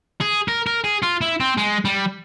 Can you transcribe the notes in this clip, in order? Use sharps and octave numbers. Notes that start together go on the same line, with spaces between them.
G#4
A#4
A#4
G#4
F4
E4
C4
G#3
G3